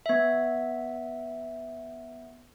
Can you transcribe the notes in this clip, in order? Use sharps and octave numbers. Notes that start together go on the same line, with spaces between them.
B3 E5